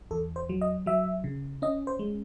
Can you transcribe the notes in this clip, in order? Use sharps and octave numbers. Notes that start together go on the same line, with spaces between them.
E2 A4
C5
F#3
D#5
F#3 E5
C#3
C#4 D#5
C5
G#3